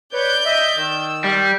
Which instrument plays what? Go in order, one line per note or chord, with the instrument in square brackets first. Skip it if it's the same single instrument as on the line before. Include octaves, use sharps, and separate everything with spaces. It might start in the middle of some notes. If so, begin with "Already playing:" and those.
[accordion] B4 C#5 [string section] D5 G6
[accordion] D#5 E5
D#3 E6
[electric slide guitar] G3